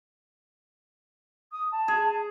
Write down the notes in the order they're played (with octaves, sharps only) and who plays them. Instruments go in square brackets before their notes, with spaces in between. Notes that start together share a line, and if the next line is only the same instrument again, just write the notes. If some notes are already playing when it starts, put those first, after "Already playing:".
[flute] D#6
A5
[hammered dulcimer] G#4